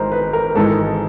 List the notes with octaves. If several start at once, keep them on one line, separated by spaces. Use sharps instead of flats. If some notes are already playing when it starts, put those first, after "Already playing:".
Already playing: G#1 G#2 E3 G#3 A#4 C5
B4
A#4
G#1 G#2 E3 G#3 A4